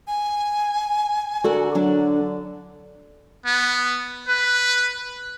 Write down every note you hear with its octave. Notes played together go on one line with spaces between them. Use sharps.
G#5
D3 F#4 A4 A#4
F#3 D4
B3
B4